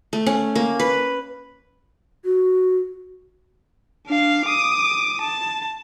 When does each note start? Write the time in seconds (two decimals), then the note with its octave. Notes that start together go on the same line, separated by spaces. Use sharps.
0.13 A3
0.26 C#4
0.56 A#3
0.80 B4
2.25 F#4
4.07 D4 F5
4.47 D6 D#6
5.21 A5